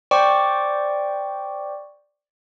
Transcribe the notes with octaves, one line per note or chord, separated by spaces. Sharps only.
C5 D5 G5 C#6 D6